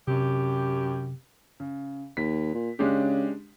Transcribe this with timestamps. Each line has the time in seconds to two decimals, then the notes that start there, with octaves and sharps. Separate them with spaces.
0.08 F#2 C3 G4
1.60 C#3
2.17 D#2 B6
2.54 A#2
2.79 C#3 G#3 D4 G4